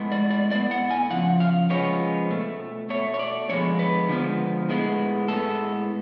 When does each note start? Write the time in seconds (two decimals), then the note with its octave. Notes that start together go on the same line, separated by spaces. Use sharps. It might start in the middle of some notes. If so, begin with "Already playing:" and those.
Already playing: A2 G#3 B3
0.12 D5
0.30 D5
0.51 A2 G#3 B3 D5
0.71 F#5
0.91 G#5
1.10 C#3 F3 F#5
1.40 F5
1.70 C#3 F3 G#3 B3 C#5
2.30 B2 A3
2.89 B2 A3 C#5
3.14 C#5
3.19 D5
3.49 D3 F3 G#3 B3 C#5
3.79 B4
4.09 D3 F3 G#3 B3
4.69 A2 G#3 B3
5.28 A2 G#3 B3 A4